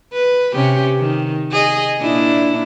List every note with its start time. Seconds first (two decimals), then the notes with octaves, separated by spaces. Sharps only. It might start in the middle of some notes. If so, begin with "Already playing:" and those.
0.13 B4
0.53 C3 C#4 G4
0.98 D#3
1.52 G#4 D#5
2.00 A#2 D4 E4